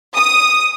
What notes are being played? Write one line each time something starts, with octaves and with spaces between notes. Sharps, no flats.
D#6